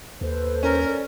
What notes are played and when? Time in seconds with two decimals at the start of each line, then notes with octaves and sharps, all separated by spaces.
0.21 D#2 A4 B4 C5
0.63 C#4 A#4
0.84 A4 D5